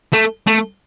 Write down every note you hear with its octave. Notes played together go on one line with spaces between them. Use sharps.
A3
A3